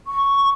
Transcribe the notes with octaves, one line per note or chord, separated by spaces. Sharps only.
C#6